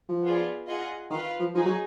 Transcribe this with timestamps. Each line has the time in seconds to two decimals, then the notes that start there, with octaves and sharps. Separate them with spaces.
0.09 F3
0.23 B3 F4 G#4 D5
0.67 F4 G#4 D#5 F#5
1.10 D#3 F4 B4 F5
1.40 F3
1.54 F3 D#4 G#4
1.65 F#3